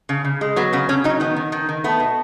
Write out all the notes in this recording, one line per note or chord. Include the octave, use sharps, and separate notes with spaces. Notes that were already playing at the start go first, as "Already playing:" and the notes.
C#3
C#3
G#3
F#3 B3
C#3 B3
C#3 C#4
F#3 D#4
D#3 B3
D#3
D#3
D#3
A3 B3
B2